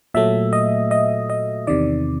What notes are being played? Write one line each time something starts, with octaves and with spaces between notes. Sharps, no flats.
A#2 F#3 A3 E5
D#5
D#5
D#5
E2 C3 D#3 D5